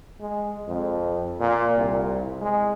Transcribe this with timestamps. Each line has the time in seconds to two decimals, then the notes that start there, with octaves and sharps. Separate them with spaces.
0.21 G#3
0.68 F2
1.40 A#2
1.77 C2
2.41 G#3